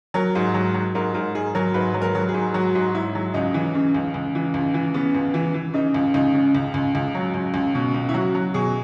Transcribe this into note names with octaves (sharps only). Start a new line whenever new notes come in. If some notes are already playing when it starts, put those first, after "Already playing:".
F#3 A#4
G#2
F#3
F#3
G#2 A#4
G#2 A#4
G#2 G#4
F#3 A#4
G#2 B4
F#3
A#4
F#3
G#4
G#2
F#3 F#4
G#2
G#2 E4
F#3
C#2 D#4
E3
C#3
C#2
C#2
E3
C#2
E3
C#3 B3
C#2
E3
E3
C#3 D#4
C#2
C#2 D#4
C#3
C#2
C#2
C#2
F#3
C#2
C#2
B2
C#2
E4
F#3 F#4
F#3
B2 G#4